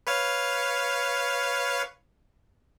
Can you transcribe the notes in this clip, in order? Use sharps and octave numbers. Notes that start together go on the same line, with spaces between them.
B4 C#5 F5